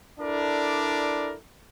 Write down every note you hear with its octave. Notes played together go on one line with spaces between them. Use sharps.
D4 E4 A4 A#4 D5